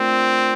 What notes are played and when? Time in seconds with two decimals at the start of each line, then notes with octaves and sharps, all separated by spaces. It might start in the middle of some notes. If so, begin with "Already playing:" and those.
Already playing: A3 C4 D4 F4 A#4 D5